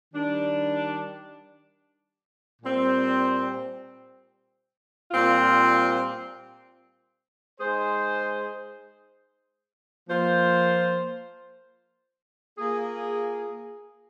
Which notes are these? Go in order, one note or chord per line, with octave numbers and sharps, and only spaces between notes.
D#3 G3 D4
A#2 G3 C4
A#2 G3 C4 F4
G#3 D#4 G#4 C5
F3 A#3 F4 C5
A#3 F4 G#4